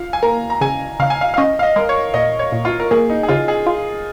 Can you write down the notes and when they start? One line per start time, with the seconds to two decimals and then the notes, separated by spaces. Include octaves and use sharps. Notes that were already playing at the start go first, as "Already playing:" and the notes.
Already playing: F4 F5
0.13 G#5
0.23 A#3 A#5
0.50 A#5
0.61 C#3 G#5
1.00 C#3 F5
1.10 G#5
1.21 F5
1.34 F5
1.37 C#4 D#5
1.59 F5
1.63 D#5
1.76 G#3 A#4
1.89 C#5
2.14 A#2 D#5
2.39 C#5
2.52 A#2
2.65 F4
2.80 A#4
2.91 A#3 G#4
3.10 D#4
3.23 G#4
3.28 C#3 F4
3.48 G#4
3.66 F4